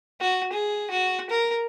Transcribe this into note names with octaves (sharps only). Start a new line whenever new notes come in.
F#4
G#4
F#4
A#4